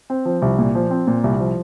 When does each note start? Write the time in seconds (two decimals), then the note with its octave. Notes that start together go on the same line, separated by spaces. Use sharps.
0.10 C4
0.25 F3
0.42 C2
0.59 A#2
0.75 F3
0.91 C4
1.07 A#2
1.24 C2
1.40 F3